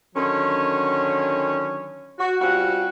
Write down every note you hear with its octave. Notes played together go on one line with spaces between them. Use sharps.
D3 D#3 F#3 C#4
F#4
G3 C4 C#4 F4 F#4